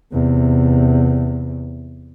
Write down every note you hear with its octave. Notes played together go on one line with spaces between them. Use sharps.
E2 C3